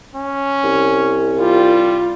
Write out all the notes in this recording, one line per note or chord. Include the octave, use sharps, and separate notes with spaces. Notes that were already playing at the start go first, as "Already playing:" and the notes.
C#4
C2
G3 F4